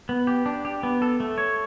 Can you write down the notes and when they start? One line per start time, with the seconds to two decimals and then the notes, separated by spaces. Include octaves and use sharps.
0.09 B3
0.27 G4
0.46 D4
0.65 G4
0.83 B3
1.02 A4
1.20 A3
1.38 C#5